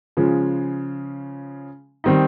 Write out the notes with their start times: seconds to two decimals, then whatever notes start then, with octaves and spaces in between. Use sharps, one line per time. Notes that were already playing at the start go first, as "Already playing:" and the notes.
0.17 C#3 F3 G#3
2.04 D#3 G3 C4 D#4